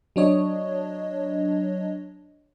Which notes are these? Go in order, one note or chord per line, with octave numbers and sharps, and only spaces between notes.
F#3 D4 C#5 D#5